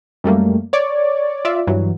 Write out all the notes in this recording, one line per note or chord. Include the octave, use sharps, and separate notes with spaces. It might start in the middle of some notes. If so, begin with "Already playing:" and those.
F#2 G3 A3 A#3
C#5 D5
F4 D5 E5
G2 E3 F#3